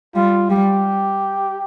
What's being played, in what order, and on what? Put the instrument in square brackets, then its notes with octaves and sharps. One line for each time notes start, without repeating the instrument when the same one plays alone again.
[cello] G3 [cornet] F4
[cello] G3 [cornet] G4